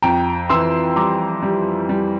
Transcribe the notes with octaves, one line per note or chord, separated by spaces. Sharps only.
F2 G5 A#5
E3 C6 E6
G3 A#5 D6
G3
G3